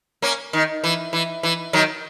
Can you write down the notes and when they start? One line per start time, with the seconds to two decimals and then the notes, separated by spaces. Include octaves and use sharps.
0.22 A#3 C#4
0.53 D#3
0.84 E3
1.13 E3
1.43 E3
1.73 D#3 F#3